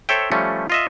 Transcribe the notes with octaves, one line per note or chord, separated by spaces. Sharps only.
A4 C5 C#5 E5 G5
F3 G3 A3 C#4 F4
F4 D#5 E5